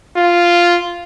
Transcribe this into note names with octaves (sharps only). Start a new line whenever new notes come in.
F4